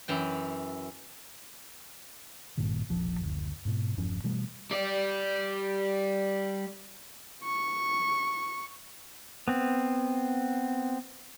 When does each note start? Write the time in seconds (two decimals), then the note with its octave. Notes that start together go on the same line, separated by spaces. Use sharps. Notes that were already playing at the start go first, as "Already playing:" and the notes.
0.08 F#2 E3 G5
2.57 G#1 G2 A#2 D#3
2.89 E1 A#1 F3
3.20 F#1 D2
3.65 G#2 B2
3.97 E1 G2 F3 C#4
4.24 B2 E3 G3 A3
4.71 G3 D5
7.44 C#6
9.48 B3 C4